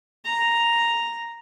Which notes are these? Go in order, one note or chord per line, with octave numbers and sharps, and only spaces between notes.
A#5